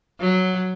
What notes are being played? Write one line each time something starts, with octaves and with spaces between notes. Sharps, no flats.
F#3